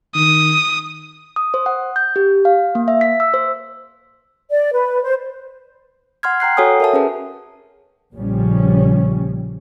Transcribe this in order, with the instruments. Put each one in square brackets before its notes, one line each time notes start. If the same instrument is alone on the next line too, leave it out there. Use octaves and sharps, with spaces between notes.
[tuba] D#3 [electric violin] D#6
[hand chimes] D#6
C5
F#5
G6
G4
F5
A#3
E5
B6
E6
C5
[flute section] D5
B4
C5
[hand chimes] F#5 C6 F6 G#6
G5 A#5 F#6 C7
F#4 A4 C#5 F#5 G#5 D#6
A#4 E5 A5
C#4 G#4 B4
[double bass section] A#1 A#2 C#3 F3 G3 C#4